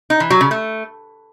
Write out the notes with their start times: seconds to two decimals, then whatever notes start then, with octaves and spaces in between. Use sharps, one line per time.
0.10 D#4
0.20 E3
0.30 F#3
0.41 C#3
0.51 A3